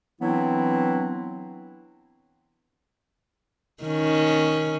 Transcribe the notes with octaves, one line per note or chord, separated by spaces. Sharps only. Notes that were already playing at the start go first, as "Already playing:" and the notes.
E3 F#3 B3 C4 D4 E4
D#3 C#4